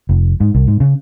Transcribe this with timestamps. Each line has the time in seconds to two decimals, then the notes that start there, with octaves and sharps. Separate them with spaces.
0.09 F1
0.40 G#2
0.54 C2
0.68 G#2
0.80 C#3